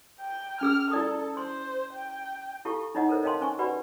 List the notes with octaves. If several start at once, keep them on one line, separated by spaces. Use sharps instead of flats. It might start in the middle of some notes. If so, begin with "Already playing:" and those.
G5
C#4 G#4 E6 F6
E4 A4 D5 D#6
C5 C6
G5
E4 G4 A4 F5 A5 C#6
D#4 E4 C#5 D#5 F#5
A4 A#4 C5 C#5
C#5 D#5 F5 G5 A5 C6
C#4 C5 G#5 C#6
F#4 G4 B4 D5 F#5 B5